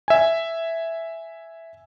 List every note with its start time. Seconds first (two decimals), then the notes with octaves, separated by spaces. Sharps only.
0.08 E5 G#5